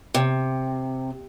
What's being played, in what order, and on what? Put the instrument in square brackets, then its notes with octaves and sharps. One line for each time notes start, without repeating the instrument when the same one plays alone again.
[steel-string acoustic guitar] C3